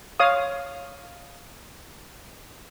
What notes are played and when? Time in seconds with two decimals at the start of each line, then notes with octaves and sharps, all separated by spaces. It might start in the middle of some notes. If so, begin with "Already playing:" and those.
0.20 C#5 F5 D#6